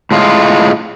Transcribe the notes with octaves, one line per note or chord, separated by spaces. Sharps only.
A2 G#3 F4